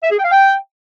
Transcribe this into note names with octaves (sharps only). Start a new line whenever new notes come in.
E5
G#4
G5
F5
G5